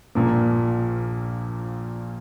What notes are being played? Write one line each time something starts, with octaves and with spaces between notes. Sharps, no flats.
A#1 A#2 F3 A#3